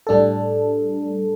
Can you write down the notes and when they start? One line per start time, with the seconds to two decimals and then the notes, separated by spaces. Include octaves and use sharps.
0.07 A2 G3 D4 A4